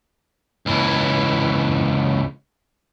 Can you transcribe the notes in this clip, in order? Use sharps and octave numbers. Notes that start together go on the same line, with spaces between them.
C#2 E3